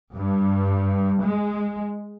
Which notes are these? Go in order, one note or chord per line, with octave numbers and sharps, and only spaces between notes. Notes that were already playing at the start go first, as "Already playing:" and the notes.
G2
G#3